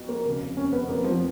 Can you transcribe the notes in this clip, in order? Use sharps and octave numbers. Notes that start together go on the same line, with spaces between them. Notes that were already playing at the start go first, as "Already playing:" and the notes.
Already playing: F2 F3 B3 F#4
A#3
F1 D#2 C#3
C#4
B3
F1 F2 D#3 A#3
F3